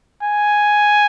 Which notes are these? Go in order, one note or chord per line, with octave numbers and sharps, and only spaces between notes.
G#5